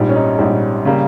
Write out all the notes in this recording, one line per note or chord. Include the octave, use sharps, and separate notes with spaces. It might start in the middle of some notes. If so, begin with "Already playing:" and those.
Already playing: A#1 G#2 G3
C#4
D#4
A#1 G#2 G3
C#3 G3 A#3